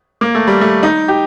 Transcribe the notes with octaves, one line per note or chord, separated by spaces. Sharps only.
A#3
A3
G3
A3
D#4
G4